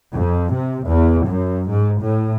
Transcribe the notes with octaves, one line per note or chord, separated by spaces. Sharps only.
F2
C3
E2
F#2
G#2
A2